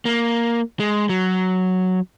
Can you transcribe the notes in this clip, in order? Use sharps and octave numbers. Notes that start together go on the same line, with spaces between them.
A#3
G#3
F#3